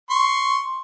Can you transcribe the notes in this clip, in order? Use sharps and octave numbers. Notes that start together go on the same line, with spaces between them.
C6 C#6